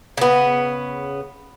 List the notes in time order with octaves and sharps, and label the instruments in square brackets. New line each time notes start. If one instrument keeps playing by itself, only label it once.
[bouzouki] C#3 B3